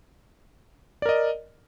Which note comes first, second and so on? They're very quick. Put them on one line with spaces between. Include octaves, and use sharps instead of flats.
D5 A#4 D#5